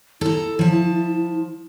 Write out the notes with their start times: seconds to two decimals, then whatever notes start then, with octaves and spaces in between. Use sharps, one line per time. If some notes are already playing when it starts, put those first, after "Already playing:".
0.21 E4 A4 A#5
0.59 F3 A5